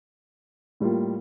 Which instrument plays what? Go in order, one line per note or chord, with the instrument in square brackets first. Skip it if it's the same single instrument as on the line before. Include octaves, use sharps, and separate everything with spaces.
[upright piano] A2 G3 A#3 F4